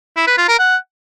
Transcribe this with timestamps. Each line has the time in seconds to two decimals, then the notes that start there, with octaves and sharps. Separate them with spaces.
0.16 E4
0.27 B4
0.38 F4
0.48 A#4
0.59 F#5